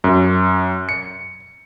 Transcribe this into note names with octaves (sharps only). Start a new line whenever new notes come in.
F#2
C#7